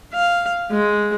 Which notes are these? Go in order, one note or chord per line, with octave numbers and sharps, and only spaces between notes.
F5
G#3